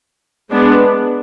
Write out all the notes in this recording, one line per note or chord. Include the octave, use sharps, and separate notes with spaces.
G#3 B3 D4